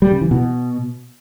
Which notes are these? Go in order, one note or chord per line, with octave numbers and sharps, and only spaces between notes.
G3
C#3
E3
B2